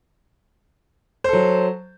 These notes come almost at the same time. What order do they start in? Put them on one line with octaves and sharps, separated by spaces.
C5 A4 F#3